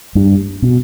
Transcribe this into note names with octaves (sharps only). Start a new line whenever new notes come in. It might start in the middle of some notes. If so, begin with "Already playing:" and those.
G2
B2